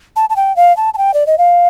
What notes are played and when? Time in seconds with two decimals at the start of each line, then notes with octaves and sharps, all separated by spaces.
0.16 A5
0.30 A5
0.36 G5
0.56 F5
0.77 A5
0.94 A5
0.98 G5
1.14 D5
1.27 D#5
1.38 F5